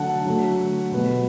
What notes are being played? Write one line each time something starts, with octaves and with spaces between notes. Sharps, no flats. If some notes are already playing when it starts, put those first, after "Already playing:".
Already playing: D3 F#3 A3 F#5 A5
D3 F#3 A3
B2 G3 B3